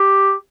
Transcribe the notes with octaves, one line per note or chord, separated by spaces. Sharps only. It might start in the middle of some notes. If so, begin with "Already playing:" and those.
Already playing: G4